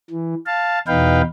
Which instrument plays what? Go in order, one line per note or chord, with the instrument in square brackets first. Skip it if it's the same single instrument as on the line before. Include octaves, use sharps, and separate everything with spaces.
[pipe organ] E3
F5 A5
E2 B2 D#4 B4 F5 G5